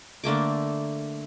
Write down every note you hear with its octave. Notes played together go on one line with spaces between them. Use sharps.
D3 A3 A#3 D6